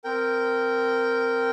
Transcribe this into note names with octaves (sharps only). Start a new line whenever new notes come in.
C4 A#4 G5